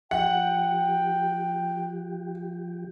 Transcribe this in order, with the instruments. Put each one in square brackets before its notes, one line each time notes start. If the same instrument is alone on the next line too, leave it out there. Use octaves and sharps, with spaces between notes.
[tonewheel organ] F3 G4 [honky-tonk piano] F#5 [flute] G5